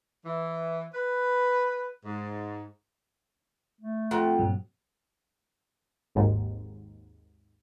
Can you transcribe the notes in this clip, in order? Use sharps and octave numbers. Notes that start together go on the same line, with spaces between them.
E3
B4
G#2
A3
F2 F#5
G2 A#2 F#3
G#1 D#2 G#2